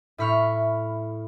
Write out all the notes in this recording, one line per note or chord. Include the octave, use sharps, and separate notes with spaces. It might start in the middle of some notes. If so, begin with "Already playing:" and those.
A2 E4 B5 C#6 F6